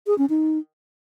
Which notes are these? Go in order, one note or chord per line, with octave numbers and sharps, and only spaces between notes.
G#4
C#4
D#4